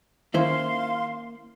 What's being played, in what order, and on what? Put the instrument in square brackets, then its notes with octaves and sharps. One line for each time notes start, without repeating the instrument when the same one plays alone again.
[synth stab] D#3 C#4 [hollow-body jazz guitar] A#3 E4 C5 [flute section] F5 C6